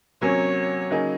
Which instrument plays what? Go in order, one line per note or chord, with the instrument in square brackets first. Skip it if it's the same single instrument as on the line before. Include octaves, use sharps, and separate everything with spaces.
[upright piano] C3 F#3 A#3 C#4 [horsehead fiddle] C#5
[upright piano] C#3 F#3 A#3 D#4 G#4